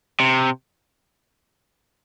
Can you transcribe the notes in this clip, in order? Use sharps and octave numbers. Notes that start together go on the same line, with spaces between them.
C3